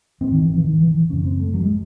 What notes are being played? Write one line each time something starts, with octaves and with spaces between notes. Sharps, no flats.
G#2 C4
D#3
E3
E3
D#3
E3
E3
F#2 C#3 C#4
C4
A3
F#3
G#3